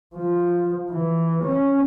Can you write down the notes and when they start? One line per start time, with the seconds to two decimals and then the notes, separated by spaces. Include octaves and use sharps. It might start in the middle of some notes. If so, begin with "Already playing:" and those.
0.15 F3
0.90 E3
1.43 C#4